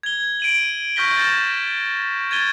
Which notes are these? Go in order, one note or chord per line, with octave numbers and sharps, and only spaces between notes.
G#6 G7
D7 D#7 F#7
C#6 F6 G6 A#6 B6 G7
A6 A#6 E7
G#6 A6 D#7 G7